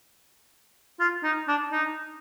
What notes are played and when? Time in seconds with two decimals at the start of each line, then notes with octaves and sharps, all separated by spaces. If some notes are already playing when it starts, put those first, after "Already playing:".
1.00 F4
1.23 D#4
1.48 D4
1.72 D#4